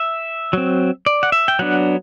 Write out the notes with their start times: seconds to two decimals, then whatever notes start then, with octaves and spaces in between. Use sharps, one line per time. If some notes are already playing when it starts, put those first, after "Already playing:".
Already playing: E5
0.53 F#3 C4
1.06 D5
1.23 F#5
1.32 E5
1.48 G5
1.59 F#3 B3 D4 F#5